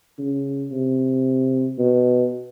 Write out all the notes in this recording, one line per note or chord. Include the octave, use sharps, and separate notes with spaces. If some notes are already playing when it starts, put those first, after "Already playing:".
C#3
C3
B2